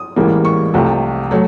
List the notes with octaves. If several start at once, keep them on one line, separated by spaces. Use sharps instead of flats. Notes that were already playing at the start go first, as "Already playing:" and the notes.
Already playing: D#6
A1 G#2 E3 G3 A#3
C#6
C2 C3 F3 A3
F#3 A3